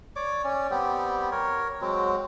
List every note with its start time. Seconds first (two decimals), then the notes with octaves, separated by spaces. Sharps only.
0.16 C#5 D5 D6
0.44 C#4 D5
0.71 G3 B3 C4 G4
1.32 A#4 C#5
1.81 F#3 G#3 C4 F#4